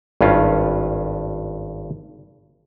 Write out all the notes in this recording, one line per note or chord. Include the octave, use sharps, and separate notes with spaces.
G#1 G2 C#4 F4